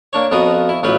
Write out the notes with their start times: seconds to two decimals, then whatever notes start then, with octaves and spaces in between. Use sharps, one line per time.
0.13 A#3 D4 C#5
0.31 F2 B3 F4 F#4 A#4 D#6
0.69 E4
0.83 A1 F#3 F4 G4 B4